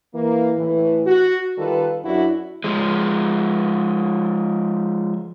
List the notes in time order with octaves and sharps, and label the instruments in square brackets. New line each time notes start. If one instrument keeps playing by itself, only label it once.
[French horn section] E3 A#3
A2 E3
F#4
D#3 G3 F4 A4 B4
F#2 D4 E4 F#4
[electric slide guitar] F3 G#3